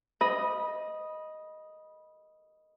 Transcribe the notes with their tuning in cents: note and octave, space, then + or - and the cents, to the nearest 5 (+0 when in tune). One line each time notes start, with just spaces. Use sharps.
D#5 +0 B5 -20